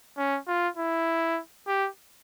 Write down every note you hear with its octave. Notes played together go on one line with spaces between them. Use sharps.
C#4
F4
E4
G4